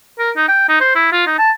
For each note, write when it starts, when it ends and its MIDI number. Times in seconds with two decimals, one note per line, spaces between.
0.18 0.31 70
0.36 0.45 63
0.48 0.66 79
0.68 0.80 63
0.80 0.94 72
0.95 1.08 64
1.12 1.22 65
1.26 1.37 63
1.38 1.51 81